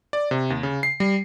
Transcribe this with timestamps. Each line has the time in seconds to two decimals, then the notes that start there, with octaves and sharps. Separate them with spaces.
0.13 D5
0.31 C3
0.50 D#2
0.63 C#3
0.83 C7
1.00 G3